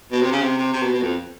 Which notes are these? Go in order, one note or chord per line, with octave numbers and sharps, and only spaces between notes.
B2
C3
C#3
C3
C3
C3
B2
B2
F2